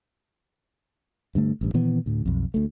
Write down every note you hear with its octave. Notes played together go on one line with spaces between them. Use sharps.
G2 D3 A3
A1 G2
A#2 D#3 E3 B3
D2 A2
B1 F2
D2 A3